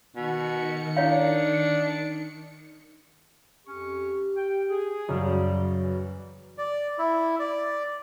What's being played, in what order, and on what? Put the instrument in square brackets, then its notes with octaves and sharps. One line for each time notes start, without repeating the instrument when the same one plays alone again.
[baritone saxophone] B2 [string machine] D#3 C#7
[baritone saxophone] D4 [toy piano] E4 C#5 F5
[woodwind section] F2 C#4 C#6 [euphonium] G4
[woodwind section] G5
G#4
[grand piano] F#2 C#3 [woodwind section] G3 [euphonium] F#4
[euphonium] F#3
[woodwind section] E3 G3
[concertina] D5
E4
D5